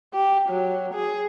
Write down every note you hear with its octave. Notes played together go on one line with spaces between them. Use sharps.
G4
F#3
G#4